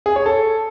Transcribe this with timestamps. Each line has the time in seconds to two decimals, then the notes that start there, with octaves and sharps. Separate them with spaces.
0.06 G#4
0.16 C#5
0.26 A4